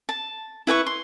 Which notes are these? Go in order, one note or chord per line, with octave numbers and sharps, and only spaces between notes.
A5
E4 B4 G5 C#6
C6